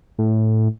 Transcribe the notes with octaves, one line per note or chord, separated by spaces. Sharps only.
A2